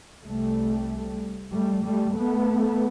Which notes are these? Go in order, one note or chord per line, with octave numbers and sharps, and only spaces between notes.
C2 C3 G3 A3
G3 A3
G3 A3
A3 B3